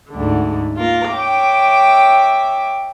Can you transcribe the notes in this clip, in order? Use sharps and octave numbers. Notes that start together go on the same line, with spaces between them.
D2 G#2 D3
A#3 F4 A#4
C#5 E5 G5 D6